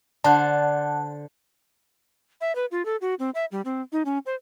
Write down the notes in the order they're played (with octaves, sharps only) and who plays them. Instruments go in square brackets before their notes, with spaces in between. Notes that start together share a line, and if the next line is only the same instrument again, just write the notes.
[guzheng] D3 C5 [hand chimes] D5 F#5 F#6 [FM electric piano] A5
[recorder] E5
B4
F4
A4
F#4
C4
E5
G3
C4
D#4
C#4
C5